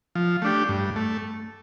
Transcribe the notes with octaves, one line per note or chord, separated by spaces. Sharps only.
F3
A3 D4 G4
G2
A3